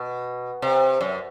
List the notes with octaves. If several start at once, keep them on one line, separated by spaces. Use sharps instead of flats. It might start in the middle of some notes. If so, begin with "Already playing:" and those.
Already playing: B2
C3
F#2